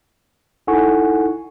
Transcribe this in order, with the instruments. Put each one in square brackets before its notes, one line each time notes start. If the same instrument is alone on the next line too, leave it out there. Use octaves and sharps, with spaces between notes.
[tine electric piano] D#4 E4 A4 F#5 G#5 C#6